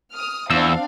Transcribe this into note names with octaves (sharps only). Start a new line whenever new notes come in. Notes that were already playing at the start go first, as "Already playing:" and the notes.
D#6 F6
E2 C4 D4 F5 E6